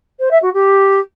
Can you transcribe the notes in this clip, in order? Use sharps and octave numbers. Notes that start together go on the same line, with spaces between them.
C5
E5
F#4
G4